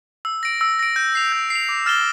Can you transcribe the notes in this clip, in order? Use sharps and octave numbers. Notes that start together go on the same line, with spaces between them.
E6
A#6 D7
E6
A#6 D7
G6
C7 F7
G6
C7
F7
D6
F6 A6 E7 G7